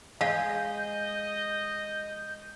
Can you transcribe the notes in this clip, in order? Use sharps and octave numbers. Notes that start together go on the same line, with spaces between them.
G#3 D#5 F5 G6